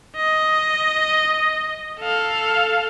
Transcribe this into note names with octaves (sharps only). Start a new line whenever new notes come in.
D#5
A4 F5